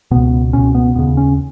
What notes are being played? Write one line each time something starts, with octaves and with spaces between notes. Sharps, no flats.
C#2 B2 B3
C#2 B2 C#4
B3
D#2 C#3 B3
C#4